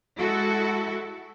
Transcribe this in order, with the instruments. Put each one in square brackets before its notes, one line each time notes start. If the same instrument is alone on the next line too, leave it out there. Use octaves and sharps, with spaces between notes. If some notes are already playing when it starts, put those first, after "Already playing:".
[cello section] G#3 E4 F#4 A4